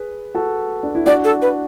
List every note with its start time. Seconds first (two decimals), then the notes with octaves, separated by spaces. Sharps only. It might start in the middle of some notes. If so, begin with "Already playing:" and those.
Already playing: G#4 B4
0.35 F#4 A4
0.83 D4
0.95 E4
1.06 D4 F#4 D5
1.24 A4
1.42 B4